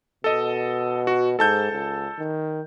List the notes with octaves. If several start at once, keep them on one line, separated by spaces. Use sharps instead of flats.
B2 A4 D#5
F#4
G#2 A4 A5 G6
C#2
D#3